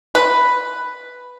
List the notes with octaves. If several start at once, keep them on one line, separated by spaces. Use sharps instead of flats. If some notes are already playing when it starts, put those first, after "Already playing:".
B4